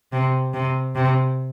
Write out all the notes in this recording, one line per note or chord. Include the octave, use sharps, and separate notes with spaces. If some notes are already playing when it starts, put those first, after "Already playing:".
C3
C3
C3